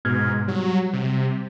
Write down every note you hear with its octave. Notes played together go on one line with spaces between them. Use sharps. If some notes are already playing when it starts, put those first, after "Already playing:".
G#2 B2 F6 G#6
F#3 G3
C3